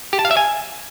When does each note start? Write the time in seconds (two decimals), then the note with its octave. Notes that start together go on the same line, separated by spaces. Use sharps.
0.13 G4
0.19 A5
0.25 F5
0.31 E5
0.37 G#5